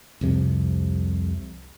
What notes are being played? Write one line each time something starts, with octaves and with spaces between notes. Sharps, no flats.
C2 F2 C3